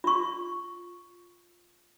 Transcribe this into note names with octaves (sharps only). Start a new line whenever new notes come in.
F4 C#6